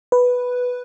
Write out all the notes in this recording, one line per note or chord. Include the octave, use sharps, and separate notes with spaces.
B4